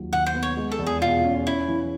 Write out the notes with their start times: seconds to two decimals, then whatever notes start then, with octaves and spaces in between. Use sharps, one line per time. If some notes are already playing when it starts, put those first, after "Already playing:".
Already playing: D#2 F#3 F4
0.12 D#3 F#5
0.26 C5
0.34 B3
0.43 C#5
0.57 G#3
0.72 A4
0.79 E2
0.87 G#4
1.01 B2 F4
1.24 C#4
1.46 C#4 E4
1.68 E3